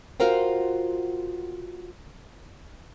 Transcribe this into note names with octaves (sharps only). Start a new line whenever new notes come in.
F4 F#4 A#4 C5 G5